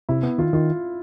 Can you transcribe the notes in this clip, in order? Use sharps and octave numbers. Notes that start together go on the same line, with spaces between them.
C3 E4
B3
D#3 F4
D#3 F4